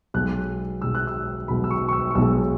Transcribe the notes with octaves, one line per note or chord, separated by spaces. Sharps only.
B1 B2 G#3 F#6
B1 B2 G#3 E6
F#6
E6
B1 B2 G#3 B5
E6
C#6
C#6
E6
C#6
B1 B2 G#3 E6